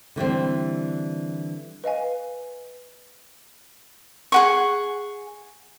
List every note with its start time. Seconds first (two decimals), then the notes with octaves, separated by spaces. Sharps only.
0.16 D3 E3 G3 C4
1.84 B4 D#5 F5 G#5
4.32 G#4 F#5 C#6